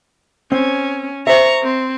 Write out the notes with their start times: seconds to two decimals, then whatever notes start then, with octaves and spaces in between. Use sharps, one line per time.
0.52 C4 C#4
1.27 C5 E5 A#5 C#6
1.63 C4